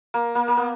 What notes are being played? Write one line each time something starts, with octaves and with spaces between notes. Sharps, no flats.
A#3
A#3
A#3
B3